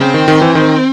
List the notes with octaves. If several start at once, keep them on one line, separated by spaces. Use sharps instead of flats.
C#3 C4
D#3
D#3
E3
D#3